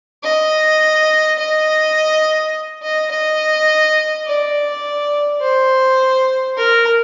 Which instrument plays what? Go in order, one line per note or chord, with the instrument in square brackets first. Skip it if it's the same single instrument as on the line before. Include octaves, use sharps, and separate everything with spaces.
[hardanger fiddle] D#5
D#5
D#5
D#5
D5
C5
A#4